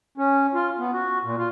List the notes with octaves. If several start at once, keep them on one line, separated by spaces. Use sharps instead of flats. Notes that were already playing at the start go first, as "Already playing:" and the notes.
C#4
F4
B3
F#4
A#2
F4